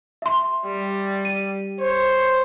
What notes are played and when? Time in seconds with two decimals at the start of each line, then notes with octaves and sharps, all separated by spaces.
0.22 E5 C6
0.65 G3
1.25 D#7
1.81 C5 C#5